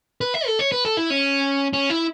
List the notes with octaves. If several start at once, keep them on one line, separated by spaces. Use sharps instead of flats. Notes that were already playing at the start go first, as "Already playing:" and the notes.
B4
E5
A4
C#5
B4
A4
E4
C#4
C#4
E4